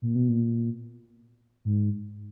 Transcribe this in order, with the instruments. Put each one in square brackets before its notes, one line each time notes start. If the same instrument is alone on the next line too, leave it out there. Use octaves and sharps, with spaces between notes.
[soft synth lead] A#2
B2
A#2
G#2